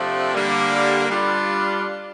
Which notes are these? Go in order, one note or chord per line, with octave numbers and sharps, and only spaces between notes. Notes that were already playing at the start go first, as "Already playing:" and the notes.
Already playing: C3 F3 A3 D4
D3 G3 A#3
G3 D4 F4